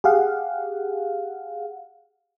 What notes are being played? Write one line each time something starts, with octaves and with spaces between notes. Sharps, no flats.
G4 G#4 F5 F#5